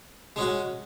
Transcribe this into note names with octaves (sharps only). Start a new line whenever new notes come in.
G#3 C#4 F#4